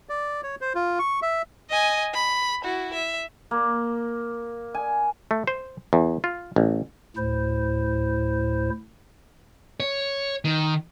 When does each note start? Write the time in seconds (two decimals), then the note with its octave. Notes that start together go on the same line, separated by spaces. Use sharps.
0.09 D5
0.43 C#5
0.61 C5
0.75 F4
0.99 C#6
1.22 E5
1.70 D#5 G#5
2.14 B5
2.62 E4 F#4
2.94 E5
3.51 A#3
4.74 G#5
5.31 A3
5.47 C5
5.93 E2
6.24 F4
6.56 A1
7.17 D2 A2 E4 C5
9.80 C#5
10.45 D#3